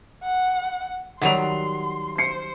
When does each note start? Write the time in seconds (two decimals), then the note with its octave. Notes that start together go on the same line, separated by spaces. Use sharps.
0.23 F#5
1.21 D#3 F#3 G3 F#5 C6 F7
2.18 C5 C7 C#7